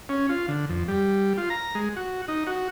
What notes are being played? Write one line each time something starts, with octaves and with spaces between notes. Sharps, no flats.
C#4
F4
D3
F2
G3
F4
A#5
G#3
F#4
D#4
F#4